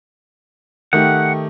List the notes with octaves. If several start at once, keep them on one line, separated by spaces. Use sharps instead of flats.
D#3 A3 G4 F#5